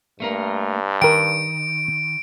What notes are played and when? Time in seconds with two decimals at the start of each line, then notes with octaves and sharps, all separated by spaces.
0.20 G2 A3 A#3 A#4
1.02 D#3 A#4 G5 D7